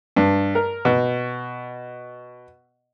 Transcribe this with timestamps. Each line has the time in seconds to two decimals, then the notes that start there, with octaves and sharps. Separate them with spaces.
0.17 G2
0.55 A#4
0.85 B2